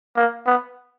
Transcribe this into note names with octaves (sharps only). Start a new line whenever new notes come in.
A#3
B3